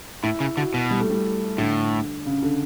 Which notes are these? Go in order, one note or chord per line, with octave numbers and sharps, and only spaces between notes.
A2 E4
C#3
D3 F#4
B2
G3
A3
G3
A2 D3
C#3
D3